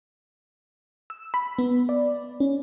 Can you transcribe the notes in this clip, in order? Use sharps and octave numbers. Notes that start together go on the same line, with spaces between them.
E6
B5
B3
D5
C#4